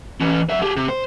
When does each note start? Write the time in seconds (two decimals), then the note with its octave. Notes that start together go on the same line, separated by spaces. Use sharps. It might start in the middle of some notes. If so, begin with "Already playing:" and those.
0.21 E3 C#4
0.50 F#3 E5
0.62 G4 G#4
0.76 C3
0.89 C5